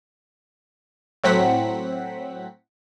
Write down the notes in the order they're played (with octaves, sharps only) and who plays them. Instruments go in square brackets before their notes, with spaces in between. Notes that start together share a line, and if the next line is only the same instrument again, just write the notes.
[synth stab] A2 F#3 C4 F#5 B6